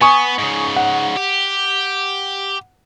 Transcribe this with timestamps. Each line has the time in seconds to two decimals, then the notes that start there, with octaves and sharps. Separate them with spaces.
0.01 B3 G#5 C#6 D#6
0.39 G#2 C#3
0.76 F#5
1.17 G4